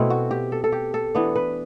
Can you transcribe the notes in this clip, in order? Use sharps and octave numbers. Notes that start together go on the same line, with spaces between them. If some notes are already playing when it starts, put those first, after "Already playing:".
Already playing: B2 A3 C4 E4
F#4
G4
A4
A4
G4
A4
E3 B3 D4
B4